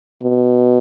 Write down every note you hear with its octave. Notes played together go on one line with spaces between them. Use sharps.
B2